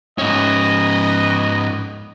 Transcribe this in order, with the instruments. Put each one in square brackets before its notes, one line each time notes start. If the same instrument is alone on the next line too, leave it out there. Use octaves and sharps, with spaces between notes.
[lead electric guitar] G#2 C#4 [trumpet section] B4 D#5